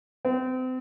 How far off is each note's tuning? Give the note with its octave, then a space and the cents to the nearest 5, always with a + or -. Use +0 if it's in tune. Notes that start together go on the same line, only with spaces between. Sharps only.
C4 -35